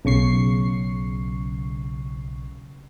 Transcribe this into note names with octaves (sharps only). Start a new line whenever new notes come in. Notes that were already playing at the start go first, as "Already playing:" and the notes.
B1 C#3 C#6 C7